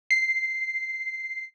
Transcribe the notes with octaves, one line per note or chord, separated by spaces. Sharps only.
C7